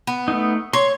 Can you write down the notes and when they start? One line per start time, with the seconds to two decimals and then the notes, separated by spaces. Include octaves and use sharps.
0.07 B3
0.28 A3 D#4
0.73 C#5 C6